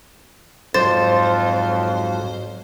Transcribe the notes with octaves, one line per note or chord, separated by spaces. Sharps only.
F2 G#2 F#3 C5 A6